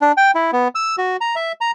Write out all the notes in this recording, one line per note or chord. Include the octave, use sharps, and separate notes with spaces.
D4
G5
E4
B3
E6
F#4
A#5
E5
A#5